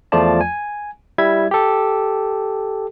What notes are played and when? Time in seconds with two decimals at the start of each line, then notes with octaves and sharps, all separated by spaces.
0.12 E2 F3 A3 F4 D5 A5
0.41 G#5
1.18 G3 E4 E5 G#6
1.51 G4 A4